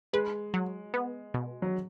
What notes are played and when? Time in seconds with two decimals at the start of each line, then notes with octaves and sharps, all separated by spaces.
0.13 G#3 B4
0.54 F#3
0.94 B3
1.34 B2
1.62 F#3